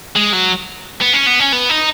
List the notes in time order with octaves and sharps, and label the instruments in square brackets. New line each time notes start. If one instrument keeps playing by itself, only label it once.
[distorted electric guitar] G#3
F#3
B3
C#4
B3
C#4
B3
D#4